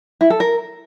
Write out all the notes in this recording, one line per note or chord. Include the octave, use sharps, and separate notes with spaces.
E4
A4
A#4